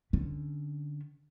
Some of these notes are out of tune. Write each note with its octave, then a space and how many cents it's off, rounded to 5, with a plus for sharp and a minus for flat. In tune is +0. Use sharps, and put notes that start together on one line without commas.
D3 +0 C#4 +0